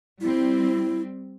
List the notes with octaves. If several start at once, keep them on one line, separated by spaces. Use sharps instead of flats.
G3 C4 E4